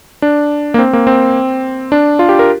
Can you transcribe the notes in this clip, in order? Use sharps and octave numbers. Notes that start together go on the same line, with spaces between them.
D4
A#3
C4
A#3
C4
D4
F4
G4
A#4